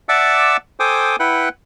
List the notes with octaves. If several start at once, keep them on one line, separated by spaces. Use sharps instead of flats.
D5 E5 F#5 A5 D6 E6
A4 C5 G5 G#5 D6 D#6
E4 B4 F#5 G5 F#6